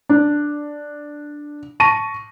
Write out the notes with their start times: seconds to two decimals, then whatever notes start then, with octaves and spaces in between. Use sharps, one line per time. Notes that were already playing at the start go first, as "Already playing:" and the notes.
0.09 D4
1.80 A5 C#6 A#6 D#7